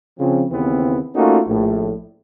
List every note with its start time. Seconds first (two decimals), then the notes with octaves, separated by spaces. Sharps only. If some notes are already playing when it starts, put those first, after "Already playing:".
0.20 C#3 F3 C4
0.51 D#2 C#3 E3 B3 C4
1.16 A3 A#3 C#4 D#4 F4 F#4
1.47 A#1 A2